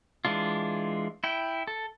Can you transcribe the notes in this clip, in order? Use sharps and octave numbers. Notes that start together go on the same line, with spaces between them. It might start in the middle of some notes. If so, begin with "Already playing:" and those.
E3 G#3 D4 F4
E4 G5
A4